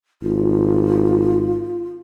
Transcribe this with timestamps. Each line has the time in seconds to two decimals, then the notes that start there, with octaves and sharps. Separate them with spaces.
0.22 G#1 F4